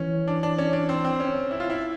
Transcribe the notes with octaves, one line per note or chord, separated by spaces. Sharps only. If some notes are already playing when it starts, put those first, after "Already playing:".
Already playing: E3 C#4
D4
D4
C#4
D4
C4
C4
C#4
E4
F4
E4